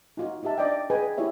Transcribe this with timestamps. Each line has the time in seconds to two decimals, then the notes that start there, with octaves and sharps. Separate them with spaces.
0.17 D#4 F4 F#4
0.43 D#4 F4 G4 E5 A5
0.58 D4 D5 D#5 G5
0.90 G#4 B4 D#5 G5 G#5
1.17 E4 F4 G4 C#5 E5